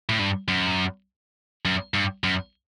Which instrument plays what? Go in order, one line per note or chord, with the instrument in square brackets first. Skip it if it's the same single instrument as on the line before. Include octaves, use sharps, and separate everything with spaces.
[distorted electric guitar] A2
G2
F#2
F#2
G2
F#2